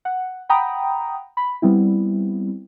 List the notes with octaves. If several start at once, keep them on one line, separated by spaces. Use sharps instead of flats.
F#5
F#5 G5 A#5 B5 D#6
B5
G3 B3 C4 E4